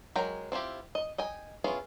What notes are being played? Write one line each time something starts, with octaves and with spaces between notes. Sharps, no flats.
F#3 G#3 A#4 G5 A#5
C4 E4 F4 G4
D#5
D#5 G5 G#5
B3 C#4 E4 F4 G#4